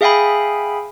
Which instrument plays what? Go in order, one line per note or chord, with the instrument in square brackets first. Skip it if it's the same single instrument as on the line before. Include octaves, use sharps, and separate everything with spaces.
[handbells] G#4 E5 F5 G5 G#5 B5